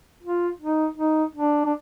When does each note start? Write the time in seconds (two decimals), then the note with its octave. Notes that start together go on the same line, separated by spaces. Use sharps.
0.23 F4
0.61 D#4
0.98 D#4
1.35 D4
1.65 D4